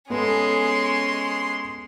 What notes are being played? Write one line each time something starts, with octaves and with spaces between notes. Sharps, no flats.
G#3 B3 C#4 A4 C6